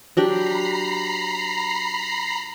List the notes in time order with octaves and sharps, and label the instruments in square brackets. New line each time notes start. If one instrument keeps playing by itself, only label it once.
[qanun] F#3 D4 G4 [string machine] A#5 B5 C7